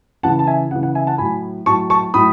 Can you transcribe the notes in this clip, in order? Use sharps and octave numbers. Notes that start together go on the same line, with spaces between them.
C#3 E3 F#5 A5
A5
E5 G#5
C#3 E3 F#5
F#5
E5 G#5
F#5 A5
A2 F#3 G#5 B5
A2 F#3 A5 C#6
A5 C#6
A2 F#3 B5 D#6